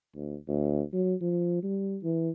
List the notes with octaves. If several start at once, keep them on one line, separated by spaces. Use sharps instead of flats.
D2
D2
F#3
F3
G3
E3